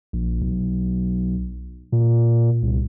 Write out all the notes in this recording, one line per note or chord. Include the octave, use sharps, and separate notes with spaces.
A#1
B1
A#2
C2